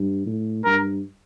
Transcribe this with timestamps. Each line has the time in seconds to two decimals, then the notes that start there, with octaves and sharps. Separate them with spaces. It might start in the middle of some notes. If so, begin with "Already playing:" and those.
Already playing: G2
0.26 A2
0.64 G2 A#4